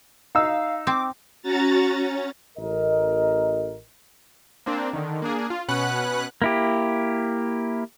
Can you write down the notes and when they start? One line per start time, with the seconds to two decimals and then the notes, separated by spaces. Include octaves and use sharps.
0.35 D#4 F5 E6
0.87 C4 D6
1.42 C#4 F#4 A#5 A6
1.86 C#4
2.58 A1 A#4 D#5
4.66 A#3 C4 D4
4.93 D3 D#3
5.22 A#3 D4 G#4
5.50 F4
5.68 B2 C#4 B4 F#5 F#6
6.42 A#3 E4 G4